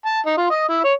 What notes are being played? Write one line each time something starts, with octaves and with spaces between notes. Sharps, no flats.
A5
D#4
F4
D#5
E4
C#5